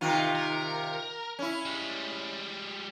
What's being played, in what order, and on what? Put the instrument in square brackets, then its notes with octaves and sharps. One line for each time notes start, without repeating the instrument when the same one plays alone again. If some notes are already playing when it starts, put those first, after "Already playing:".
[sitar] C3 D#3 F4
[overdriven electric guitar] A#4
[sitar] C#4 E4
[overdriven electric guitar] G3 G#3